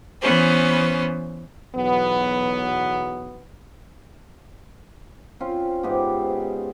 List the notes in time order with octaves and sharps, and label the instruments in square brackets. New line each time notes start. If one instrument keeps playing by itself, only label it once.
[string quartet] E3 B3 C#4 C5
[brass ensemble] B1 E2 F#3 B3
[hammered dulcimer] C4 C#4 F4
G#2 B3 F4 G4